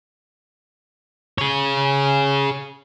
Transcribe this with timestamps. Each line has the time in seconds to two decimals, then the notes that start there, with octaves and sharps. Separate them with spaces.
1.38 G#4 C#5